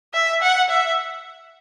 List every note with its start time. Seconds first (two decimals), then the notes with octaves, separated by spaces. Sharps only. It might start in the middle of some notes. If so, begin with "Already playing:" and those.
0.14 E5
0.42 F#5
0.70 E5